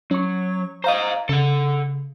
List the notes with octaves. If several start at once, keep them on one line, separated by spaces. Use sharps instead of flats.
F#3 C#4 C#6
C5 D#5 F5 A#5
C#3 A4 F#5